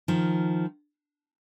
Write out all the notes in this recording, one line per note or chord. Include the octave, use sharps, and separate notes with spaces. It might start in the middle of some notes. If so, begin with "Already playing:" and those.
D#3 F3